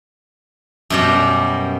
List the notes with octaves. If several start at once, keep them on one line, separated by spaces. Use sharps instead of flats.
F#2 B2 G3